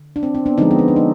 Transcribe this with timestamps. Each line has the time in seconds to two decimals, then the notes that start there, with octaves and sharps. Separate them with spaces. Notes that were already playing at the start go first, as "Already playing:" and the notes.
Already playing: D3
0.16 D4
0.23 C4
0.35 C4
0.46 B3 D4
0.58 D3 F3 G#3 C4 D#4
0.71 B3
0.79 C4
0.88 D4
0.96 D#4